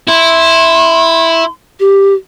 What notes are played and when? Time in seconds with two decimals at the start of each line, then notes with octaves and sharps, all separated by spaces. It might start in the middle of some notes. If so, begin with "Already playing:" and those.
0.08 E4 C6
1.80 G4